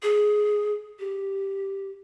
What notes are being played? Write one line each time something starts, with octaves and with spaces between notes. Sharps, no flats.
G#4
G4